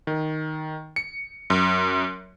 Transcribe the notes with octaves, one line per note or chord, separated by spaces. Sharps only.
D#3
C#7
F#2